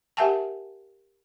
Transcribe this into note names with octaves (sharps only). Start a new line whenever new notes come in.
G4 A#4 E5 F#5 G#5 A5